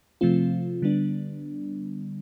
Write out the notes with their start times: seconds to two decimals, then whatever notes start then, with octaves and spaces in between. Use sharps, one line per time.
0.21 C3 F3 A3 C4 F4
0.82 D3 G3 B3 D4